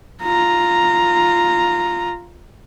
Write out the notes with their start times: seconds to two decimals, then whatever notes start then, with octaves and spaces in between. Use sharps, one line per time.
0.23 F4 A#5